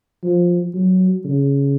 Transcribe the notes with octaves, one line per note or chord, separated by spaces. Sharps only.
F3
F#3
C#3